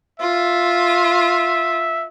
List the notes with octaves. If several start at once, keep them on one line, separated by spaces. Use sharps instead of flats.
F4 E5